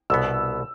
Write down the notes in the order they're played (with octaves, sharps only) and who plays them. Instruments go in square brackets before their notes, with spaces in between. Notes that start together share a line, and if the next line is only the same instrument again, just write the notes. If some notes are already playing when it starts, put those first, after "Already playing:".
[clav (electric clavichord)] C2 B2 B3 [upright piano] E6